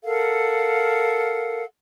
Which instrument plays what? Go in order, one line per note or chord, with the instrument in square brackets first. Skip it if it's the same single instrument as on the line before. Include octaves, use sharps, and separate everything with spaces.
[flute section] A4 A#4 F5 F#5